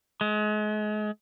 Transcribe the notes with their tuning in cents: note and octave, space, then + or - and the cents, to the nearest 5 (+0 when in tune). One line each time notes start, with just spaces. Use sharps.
G#3 +35